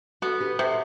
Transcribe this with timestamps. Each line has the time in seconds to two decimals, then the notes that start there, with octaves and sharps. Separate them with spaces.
0.22 B3 F#4 A4
0.40 G4 B4
0.59 C3 A4 C5